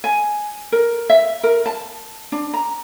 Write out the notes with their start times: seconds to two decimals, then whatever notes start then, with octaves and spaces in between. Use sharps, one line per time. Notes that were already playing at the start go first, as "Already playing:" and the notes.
0.04 G#5
0.72 A#4
1.10 E5
1.43 A#4
1.66 A5
2.32 D4
2.54 A#5